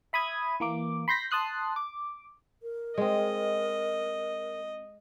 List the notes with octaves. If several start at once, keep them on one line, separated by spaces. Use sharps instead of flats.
E5 B5 D#6 G#6
E3 A#3 D6
B5 C6 G6 A#6 B6
A5 C6 D#6 F#6 C7
D6
A#4
G#3 C4 D#5